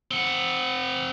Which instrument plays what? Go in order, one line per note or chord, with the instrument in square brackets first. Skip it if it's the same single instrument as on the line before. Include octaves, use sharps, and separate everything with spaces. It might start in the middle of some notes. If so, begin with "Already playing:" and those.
[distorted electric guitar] C4 F#5